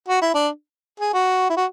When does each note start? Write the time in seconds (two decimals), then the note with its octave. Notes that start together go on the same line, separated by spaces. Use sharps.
0.08 F#4
0.21 E4
0.34 D4
1.00 G#4
1.13 F#4
1.49 E4
1.57 F#4